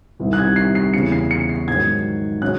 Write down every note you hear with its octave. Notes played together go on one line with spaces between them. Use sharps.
C2 C3 D#3
F#6
G#6
C7
C7
E2 C#3 E3 C#7
C7
C#7
C7
G#2 D#3 F#3 G#6
C#3 F#3 F#6